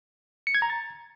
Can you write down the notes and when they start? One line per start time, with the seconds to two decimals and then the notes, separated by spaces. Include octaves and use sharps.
0.47 C#7
0.55 G#6
0.62 A#5
0.70 A6